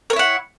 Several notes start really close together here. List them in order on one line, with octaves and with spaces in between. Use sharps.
A#4 C#5 E4 F#5